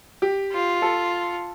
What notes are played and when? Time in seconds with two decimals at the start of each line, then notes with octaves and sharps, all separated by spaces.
0.22 G4
0.52 F4
0.82 A4